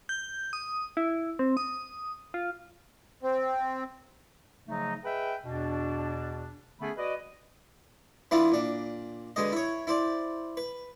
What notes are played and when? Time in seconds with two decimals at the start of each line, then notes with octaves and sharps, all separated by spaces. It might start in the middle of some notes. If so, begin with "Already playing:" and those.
0.09 G6
0.53 D#6
0.97 E4
1.39 C4
1.57 D#6
2.34 F4
3.23 C4
4.67 C#3 F3 F#3 A3 D#4
5.05 G#4 B4 D#5 E5 G5
5.45 E2 B2 D4
6.81 D3 A3 B3 C#4 G#4 B5
6.97 F#4 B4 D5 D#5
8.31 E3 B3 D4 E4 F4
8.51 A#2 D4
9.36 B2 D3 G#3 D#5
9.52 E4 C#5
9.87 E4 C5 D5
10.57 B4